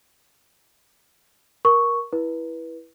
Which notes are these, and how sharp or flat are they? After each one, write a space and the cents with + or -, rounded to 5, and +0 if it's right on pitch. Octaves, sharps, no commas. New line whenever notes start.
A#4 +20 C#6 +0
E4 +0 B4 -20